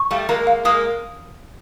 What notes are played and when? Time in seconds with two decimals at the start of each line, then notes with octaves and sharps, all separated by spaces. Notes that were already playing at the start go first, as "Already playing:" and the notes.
Already playing: C#6
0.11 G3 A3 F5
0.29 G#3 A#3 A#5
0.47 F5
0.65 G#3 A#3 D#6